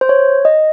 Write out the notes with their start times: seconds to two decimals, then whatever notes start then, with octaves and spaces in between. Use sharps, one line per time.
0.01 C5
0.09 C#5
0.45 D#5